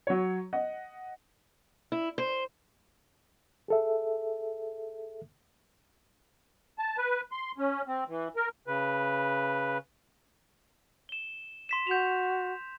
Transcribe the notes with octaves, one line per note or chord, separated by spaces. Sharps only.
F#3 C#5
D#5 F#5
E4
C5
G#4 A4 E5
A5
B4
C6
C#4
C4
E3
A#4
C#3 B4
E7 G7
C6 B6 E7
F#4 G6 F7